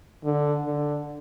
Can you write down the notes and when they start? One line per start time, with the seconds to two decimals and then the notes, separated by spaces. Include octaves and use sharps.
0.24 D3
0.66 D3